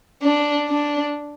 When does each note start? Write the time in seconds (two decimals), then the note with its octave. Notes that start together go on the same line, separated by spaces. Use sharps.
0.23 D4
0.68 D4